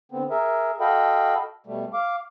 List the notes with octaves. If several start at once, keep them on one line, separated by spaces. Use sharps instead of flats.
D3 B3 C4
G#4 A#4 E5
F#4 A4 D#5 F5 G5 B5
B2 G3 A3
F5 D6